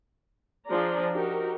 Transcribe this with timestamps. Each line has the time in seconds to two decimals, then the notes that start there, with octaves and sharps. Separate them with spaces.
0.68 F3 D4 G#4 D5 A#5
1.14 D#4 F#4 G4 A#4